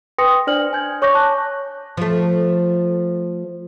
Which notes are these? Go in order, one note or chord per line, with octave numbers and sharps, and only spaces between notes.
B4 G5 C6 D#6 A#6 C#7
D4 C5 D5 F6 F#7
G#5 G6 G#6
C#5 C#6 D6 G6 A#6
A5 D6 F#6
F3 A3